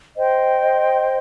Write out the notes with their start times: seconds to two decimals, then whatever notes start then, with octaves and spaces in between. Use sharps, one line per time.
0.17 C5 D#5 G5 C6